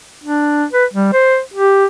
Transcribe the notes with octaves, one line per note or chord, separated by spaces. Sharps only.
D4
B4
G3
C5
G4